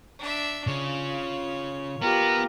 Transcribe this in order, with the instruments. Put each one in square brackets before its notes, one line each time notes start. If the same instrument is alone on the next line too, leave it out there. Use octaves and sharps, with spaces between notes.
[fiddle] D4 E5
[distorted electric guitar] C#3 [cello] F4 [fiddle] C#5
[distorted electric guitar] B3 [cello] F4 G4 [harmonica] A#4